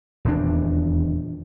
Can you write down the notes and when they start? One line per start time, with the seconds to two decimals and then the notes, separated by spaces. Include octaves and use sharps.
0.25 D#1 E2 D4